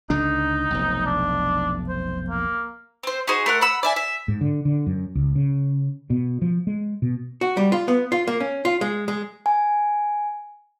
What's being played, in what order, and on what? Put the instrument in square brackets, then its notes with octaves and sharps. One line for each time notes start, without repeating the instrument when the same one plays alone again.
[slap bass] C#2 D3 D4 [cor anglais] D#4
[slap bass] F1 B1
[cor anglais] D4
C5
A#3
[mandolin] C4 C5
D#4 F#4 G#4 C5
A3 A#4 F#5
F#5 B5 E6
D5 E5 G#5
E5
[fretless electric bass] G#2
D3
D3
F#2
C#2
C#3
B2
F3
G#3
B2
[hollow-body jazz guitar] F#4
G3
F4
B3
F4
A#3
C#4
F4
G#3
G#3
[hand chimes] G#5